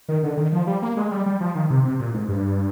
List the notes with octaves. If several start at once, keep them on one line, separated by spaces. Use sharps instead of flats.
D#3
D3
D#3
F3
G3
A#3
G#3
G3
G3
F3
D#3
C3
C3
A#2
G#2
G2